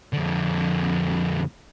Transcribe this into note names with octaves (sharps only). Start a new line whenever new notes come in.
F2 D3